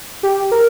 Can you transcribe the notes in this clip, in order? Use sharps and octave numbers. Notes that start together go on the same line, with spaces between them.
G4
A#4